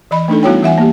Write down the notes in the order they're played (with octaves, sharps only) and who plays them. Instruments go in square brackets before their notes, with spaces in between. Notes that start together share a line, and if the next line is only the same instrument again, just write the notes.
[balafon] E3 D#5 B5
A3 D4 D#4 A4
G3 B3 E4 F#4 C#5 G5
E3 E5 F#5 G#5
A#3 G4